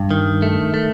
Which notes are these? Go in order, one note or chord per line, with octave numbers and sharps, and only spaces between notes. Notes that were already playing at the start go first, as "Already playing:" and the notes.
Already playing: G2
D#3
A3
A3